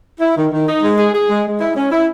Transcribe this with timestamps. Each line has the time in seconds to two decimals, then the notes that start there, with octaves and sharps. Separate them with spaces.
0.20 E4
0.37 D#3
0.52 D#3
0.67 D#4
0.83 G#3
0.98 G#4
1.14 G#4
1.29 G#3
1.46 G#3
1.61 E4
1.76 C#4
1.91 E4